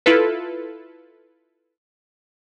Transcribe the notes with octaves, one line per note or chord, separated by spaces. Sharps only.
E4 F4 A4 B4